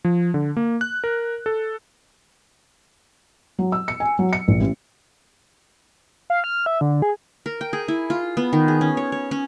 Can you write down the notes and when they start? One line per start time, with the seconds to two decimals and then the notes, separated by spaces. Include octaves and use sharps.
0.05 F3
0.34 D3
0.57 A#3
0.81 F#6
1.04 A#4
1.46 A4
3.59 F#3
3.72 E6
3.88 C#7
4.00 G#5
4.19 F#3
4.33 C#7
4.48 A#1
4.60 A1
6.30 F5
6.44 F6
6.66 E5
6.81 D3
7.02 G#4
7.46 A#4
7.61 G5
7.73 G#4
7.88 E4
8.10 F4
8.37 B3
8.53 D#3
8.68 G#4
8.81 C#4
8.97 C#5
9.12 C#5
9.31 C#4